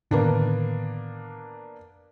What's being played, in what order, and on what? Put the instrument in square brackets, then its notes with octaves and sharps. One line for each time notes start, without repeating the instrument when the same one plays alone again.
[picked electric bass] A2 D3 D#3 [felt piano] A#3 B3 D4